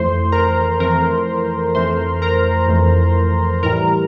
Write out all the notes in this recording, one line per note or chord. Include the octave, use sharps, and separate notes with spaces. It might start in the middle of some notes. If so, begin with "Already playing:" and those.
Already playing: F2 E3 A3 C5 C6
A#4 A#5
F2 E3 A3 A#4 A#5
F2 E3 A3 C5 C6
A#4 A#5
F2 E3 A3
A2 E3 G3 A#4 A#5